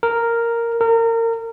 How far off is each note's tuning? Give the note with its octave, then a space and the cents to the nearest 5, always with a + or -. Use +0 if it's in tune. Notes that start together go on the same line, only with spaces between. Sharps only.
A#4 -5
A#4 -30